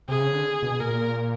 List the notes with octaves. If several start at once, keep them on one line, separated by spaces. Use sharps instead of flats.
C3 G#4
C#3
D3
B2
A#2 A#4